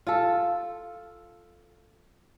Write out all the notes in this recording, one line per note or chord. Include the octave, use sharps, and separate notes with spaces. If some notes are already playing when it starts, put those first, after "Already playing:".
F4 A4